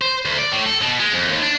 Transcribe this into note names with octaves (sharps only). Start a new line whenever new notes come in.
C5
D2
D5
A2
A4
B2
G#3
F2
D#2
D4